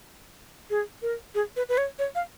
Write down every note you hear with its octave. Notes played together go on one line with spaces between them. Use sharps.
G#4
A#4
G#4
B4
B4
C#5
C#5
F5